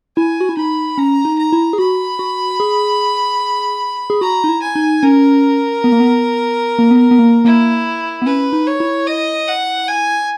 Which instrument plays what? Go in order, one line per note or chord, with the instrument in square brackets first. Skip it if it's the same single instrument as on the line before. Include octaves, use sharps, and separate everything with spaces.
[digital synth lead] E4 [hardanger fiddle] G#5
[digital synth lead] F#4
E4
[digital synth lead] D#4 [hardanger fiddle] B5
[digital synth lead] C#4 [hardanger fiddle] A#5
[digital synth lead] D#4
[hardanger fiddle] A#5
[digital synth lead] E4
G#4
[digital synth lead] F#4 [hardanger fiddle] B5
[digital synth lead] F#4
G#4
G#4
[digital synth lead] F#4 [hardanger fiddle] A#5
[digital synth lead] D#4
E4
[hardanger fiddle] G#5
[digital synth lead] D#4
[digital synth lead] C#4 [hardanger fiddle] A#4
[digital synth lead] B3
A#3
B3
A#3
B3
B3
A#3
[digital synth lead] A#3 [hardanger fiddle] E4
[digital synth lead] B3
[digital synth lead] C#4 [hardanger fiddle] B4
[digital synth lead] D#4
[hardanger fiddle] C#5
[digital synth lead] E4
[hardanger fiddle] D#5
F#5
G#5